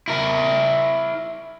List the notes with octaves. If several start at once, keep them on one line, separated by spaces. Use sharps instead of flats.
E4 A#4